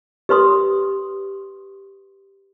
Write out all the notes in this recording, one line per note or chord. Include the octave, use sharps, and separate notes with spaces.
G4 B4 C6 D#6